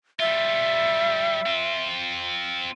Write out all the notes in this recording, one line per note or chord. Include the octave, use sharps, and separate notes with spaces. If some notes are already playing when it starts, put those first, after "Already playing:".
G3 F4 E5
C4 F4